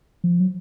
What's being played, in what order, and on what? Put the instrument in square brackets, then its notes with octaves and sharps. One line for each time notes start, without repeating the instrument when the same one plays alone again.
[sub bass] F3
F#3